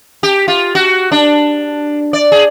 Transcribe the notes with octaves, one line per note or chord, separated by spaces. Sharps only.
G4
F4
F#4
D4
D5
G#4